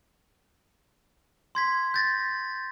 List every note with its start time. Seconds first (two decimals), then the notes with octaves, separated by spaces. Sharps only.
1.55 C6 G#6 B6
1.94 G6 A6 A#6